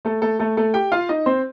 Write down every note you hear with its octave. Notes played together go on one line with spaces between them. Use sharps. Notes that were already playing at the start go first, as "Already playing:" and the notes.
A3 A4
A3 A4
A3 A4
A3 A4
G4 G5
F4 F5
D#4 D#5
C4 C5